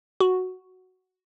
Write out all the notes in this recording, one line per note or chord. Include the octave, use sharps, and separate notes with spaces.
F#4